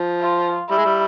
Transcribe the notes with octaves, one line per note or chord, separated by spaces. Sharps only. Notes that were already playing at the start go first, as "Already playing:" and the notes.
Already playing: F3
F4
G3 E4
G#3
G3